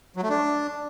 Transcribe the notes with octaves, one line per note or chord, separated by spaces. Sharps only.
F#3
A3
D4